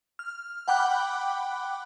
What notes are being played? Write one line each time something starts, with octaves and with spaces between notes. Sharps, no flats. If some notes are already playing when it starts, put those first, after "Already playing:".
F6
F#5 G5 B5 D6 F#6